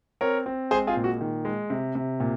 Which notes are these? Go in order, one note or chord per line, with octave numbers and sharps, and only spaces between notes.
C4 A#4 C#5
C4
G#3 G#4 C5
F4 G#4
A#2
F#4
D#3
G#3
C3
C3
A#2